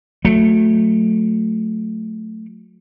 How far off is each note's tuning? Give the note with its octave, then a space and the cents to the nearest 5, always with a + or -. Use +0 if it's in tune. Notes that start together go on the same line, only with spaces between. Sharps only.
F#3 -30 A3 +0